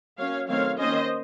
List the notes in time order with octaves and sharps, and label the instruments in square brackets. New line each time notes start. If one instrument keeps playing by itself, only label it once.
[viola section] F#3 A#3 C#4 C#5 F5
D#3 F#3 A3 C4 C#5 F5
D#3 A#3 C#4 C5 D#5